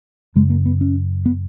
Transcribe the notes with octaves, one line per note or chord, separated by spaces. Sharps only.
F#2 C#3 G#3
A#3
B3
C#4
B3